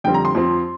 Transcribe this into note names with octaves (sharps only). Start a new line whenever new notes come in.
F2 D3 G3 C4 G5
A#5
C6
F2 F3 C4